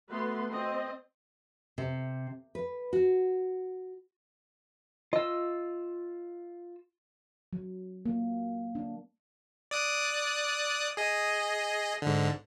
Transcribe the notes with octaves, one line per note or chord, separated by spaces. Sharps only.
A3 B3 F#4 B4 C6
C4 D#5
C3
B4
F#4
F4 D#5 E6
F#3
A#3
D4
D5 D#6 F#6
G#4 D#5
G#2 D3